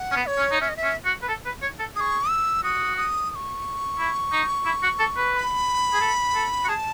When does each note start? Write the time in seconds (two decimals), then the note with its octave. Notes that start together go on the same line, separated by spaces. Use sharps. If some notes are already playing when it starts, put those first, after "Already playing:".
Already playing: F#5
0.11 C#4
0.16 B3
0.26 C#5
0.38 C#4
0.51 D#4
0.61 C#4 E5
0.69 D#5
0.77 E5
0.84 C#4
1.05 F#4
1.22 B4
1.28 A4
1.45 B4
1.62 C#5
1.79 A4
1.96 G#4 C#6 D#6
2.29 E6
2.63 F#4 D#6
2.97 D#6
3.31 D#6
3.35 C#6
3.98 E4
4.32 D#4
4.65 E4
4.83 F#4
4.99 A4
5.16 B4
5.33 C#6
5.37 B5
5.93 G#4
6.01 A4
6.35 A4
6.65 F#4
6.68 G#4 A5